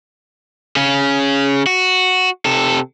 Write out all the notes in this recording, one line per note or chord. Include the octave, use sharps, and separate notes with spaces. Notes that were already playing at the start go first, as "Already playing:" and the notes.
C#3 C#4
F#4
C3 A4